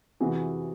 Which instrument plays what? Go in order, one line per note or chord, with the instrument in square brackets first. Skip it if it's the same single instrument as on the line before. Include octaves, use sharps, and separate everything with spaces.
[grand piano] F2 C3 E3 F#4 G#4